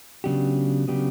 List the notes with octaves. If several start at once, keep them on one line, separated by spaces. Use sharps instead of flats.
C#3 F#3 B3 D4 G4
C#3 F#3 B3 D4 G4